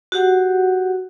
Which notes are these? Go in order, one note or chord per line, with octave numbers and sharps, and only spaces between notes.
F#4 G4 F#5